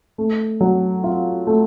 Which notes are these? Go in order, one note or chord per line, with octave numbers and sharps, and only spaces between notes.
A3
F#3
F4
A3